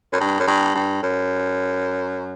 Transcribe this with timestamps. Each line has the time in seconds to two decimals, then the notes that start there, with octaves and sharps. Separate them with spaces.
0.13 F#2
0.20 G2
0.40 F#2
0.48 G2
0.75 G2
1.03 F#2